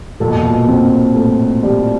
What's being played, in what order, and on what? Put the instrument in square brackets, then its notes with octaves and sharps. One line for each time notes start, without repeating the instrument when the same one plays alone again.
[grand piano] A#2 [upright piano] A4
[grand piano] B2
A#2
B2
A#2
[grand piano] A#2 [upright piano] C4
[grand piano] A2 [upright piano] A4
[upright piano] G3